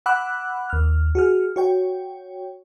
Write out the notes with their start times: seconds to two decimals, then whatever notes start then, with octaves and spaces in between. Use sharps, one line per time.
0.06 F#5 B5 D6 E6 F#6
0.70 D#2 F6
1.15 F#4 G#4 F6
1.56 F#4 C#5 G5